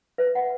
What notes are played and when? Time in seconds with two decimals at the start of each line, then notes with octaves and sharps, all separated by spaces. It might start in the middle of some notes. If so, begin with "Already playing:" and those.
0.18 B4 E5
0.35 F#5